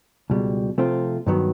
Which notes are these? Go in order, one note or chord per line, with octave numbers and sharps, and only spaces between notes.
C#2 B2 G3
C3 F3 A3 C4 F4
G2 D#3 F#3 B3